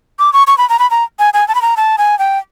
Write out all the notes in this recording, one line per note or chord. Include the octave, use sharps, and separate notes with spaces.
D6
C#6
C#6
B5
A#5
B5
A#5
G#5
G#5
A5
B5
A#5
A5
G#5
G5